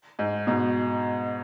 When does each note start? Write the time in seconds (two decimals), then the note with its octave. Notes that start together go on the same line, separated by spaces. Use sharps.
0.19 G#2
0.47 G#2 B2